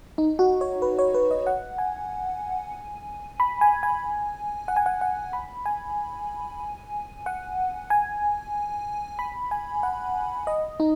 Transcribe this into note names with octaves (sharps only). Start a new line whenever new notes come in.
D#4
F#4
C#5
B4
C#5
B4
D#5
F#5
G#5
B5
G#5
G#5
F#5
G#5
F#5
F#5
B5
G#5
F#5
G#5
B5
G#5
F#5
D#5
D#4